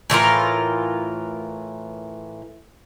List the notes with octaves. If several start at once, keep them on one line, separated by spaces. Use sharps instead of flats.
A2 E3 F4 A#4